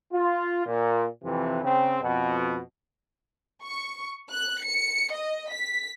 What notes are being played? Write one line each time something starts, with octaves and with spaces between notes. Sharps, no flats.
F4
A#2
F2 C3 E3
C#3 C4
F2 B2
C#6
F#6
C#7
D#5
B6